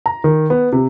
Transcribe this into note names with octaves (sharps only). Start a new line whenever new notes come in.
A#5
D#3
B3
C3